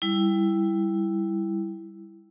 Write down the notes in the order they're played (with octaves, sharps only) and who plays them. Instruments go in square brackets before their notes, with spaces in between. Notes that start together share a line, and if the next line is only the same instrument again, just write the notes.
[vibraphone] G3 E4